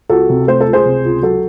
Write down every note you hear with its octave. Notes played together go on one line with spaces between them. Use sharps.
C#2 F#4 A4
C3
A3 C5
A4
C#2
G#4 C5
C3
C#2
F#3 F#4 A4